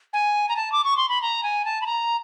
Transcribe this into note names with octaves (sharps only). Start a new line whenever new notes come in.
G#5
A#5
A5
D6
C#6
C6
B5
A#5
G#5
A5
B5
A#5